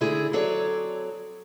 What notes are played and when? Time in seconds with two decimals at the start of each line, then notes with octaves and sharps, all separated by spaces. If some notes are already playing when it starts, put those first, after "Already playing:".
0.01 D3 D#3 G#3 A3 E4 G#4
0.33 F#3 C4 G#4 A4 C#5 D5